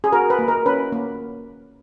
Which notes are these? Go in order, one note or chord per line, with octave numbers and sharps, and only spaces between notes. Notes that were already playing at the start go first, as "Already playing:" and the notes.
G#4
F#4 A#4
B4
A#3
A#4
C#4 B4
A#3